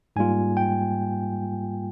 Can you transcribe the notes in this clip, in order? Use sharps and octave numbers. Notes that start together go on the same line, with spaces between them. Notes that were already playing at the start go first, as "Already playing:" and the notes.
G#2 G3 A#3 F4 G#5
G5